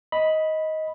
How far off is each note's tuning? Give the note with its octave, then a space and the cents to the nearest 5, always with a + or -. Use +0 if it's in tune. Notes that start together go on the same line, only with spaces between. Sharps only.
D#5 +15 B5 +0